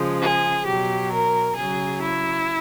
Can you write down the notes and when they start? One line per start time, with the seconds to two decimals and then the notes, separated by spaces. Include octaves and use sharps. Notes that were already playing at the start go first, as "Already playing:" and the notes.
Already playing: C#3 F3 G#3
0.20 G#4
0.65 B2 F#3 G4
1.11 A#4
1.56 C#3 F#3 G#4
2.01 E4